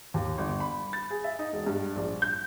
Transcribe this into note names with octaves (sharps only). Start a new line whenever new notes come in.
D#2
G1
B5
A6
G#4
E5
D#4
E1
G2
A#1
G6